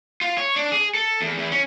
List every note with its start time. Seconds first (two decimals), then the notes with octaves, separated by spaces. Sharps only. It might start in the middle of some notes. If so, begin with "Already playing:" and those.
0.21 F4
0.38 C#5
0.56 D4
0.72 G#4
0.94 A4
1.21 E2
1.38 E2
1.52 C#4